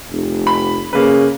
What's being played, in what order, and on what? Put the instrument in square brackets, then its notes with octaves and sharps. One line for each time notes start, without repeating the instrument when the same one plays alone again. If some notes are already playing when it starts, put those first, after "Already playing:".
[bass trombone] F1
[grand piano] B5
[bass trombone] C#3 [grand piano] A#3 B4